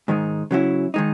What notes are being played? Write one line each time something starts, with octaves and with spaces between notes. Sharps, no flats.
G#2 D#3 G#3 D#4
C#3 F#3 C#4 E4
D#3 G#3 D#4